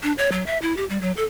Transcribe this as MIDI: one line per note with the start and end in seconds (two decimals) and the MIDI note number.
0.03 0.12 62
0.18 0.29 73
0.32 0.44 54
0.47 0.58 76
0.62 0.76 64
0.77 0.85 67
0.90 0.98 55
1.01 1.12 54
1.17 1.24 69